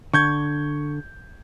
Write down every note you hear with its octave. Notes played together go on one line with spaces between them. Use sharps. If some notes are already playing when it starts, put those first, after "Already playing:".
D3 C#6 G6 G#6